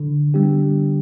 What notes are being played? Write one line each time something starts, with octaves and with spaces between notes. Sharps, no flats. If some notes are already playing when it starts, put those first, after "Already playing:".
Already playing: D3
G3 B3 D4 G4